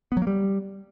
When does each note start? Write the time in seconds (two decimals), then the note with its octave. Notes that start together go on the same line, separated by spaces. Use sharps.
0.12 B3
0.17 F#3
0.22 A#3
0.27 G3